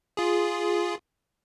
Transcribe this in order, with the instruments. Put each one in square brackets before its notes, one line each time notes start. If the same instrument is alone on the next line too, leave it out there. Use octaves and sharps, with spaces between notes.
[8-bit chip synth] F4 G#4